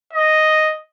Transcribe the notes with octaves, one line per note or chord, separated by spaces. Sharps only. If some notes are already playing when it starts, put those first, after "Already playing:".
D#5